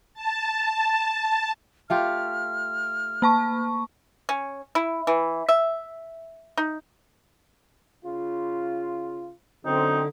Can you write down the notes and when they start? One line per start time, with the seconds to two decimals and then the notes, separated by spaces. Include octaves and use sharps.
0.14 A5
1.90 A3 F4 G4 F6
3.22 A#3 A5 C#6
4.29 C#4
4.75 E4
5.07 E3
5.49 E5
6.58 D#4
8.05 C#3 F4
9.65 F#2 D3 C4 D#4